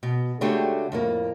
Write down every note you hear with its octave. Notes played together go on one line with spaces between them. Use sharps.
B2
C#3 G#3 A3 D4 F#4 G4
F2 A2 A#3